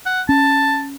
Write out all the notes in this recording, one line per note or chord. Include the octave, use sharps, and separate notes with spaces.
F#5
C#4 A5